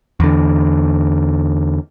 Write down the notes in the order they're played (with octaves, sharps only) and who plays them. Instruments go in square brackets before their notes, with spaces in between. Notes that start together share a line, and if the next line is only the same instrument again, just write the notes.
[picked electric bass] E2 D3